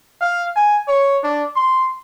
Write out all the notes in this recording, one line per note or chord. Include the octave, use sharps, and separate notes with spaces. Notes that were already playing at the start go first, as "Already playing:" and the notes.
F5
G#5
C#5
D4
C6